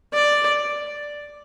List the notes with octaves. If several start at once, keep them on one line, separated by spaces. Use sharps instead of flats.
D5